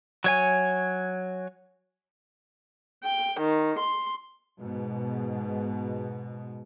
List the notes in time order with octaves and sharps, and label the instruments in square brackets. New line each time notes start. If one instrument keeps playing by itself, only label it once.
[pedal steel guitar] F#3 C#5 G#5
[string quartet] G5
D#3
C6
[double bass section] G#2 B2